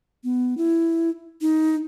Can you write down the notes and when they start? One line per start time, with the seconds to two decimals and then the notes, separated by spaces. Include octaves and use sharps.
0.24 B3
0.57 E4
1.41 D#4